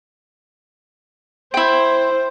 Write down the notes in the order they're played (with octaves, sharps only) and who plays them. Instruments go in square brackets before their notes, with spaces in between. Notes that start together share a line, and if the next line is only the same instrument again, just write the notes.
[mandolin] E4 G5 [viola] C5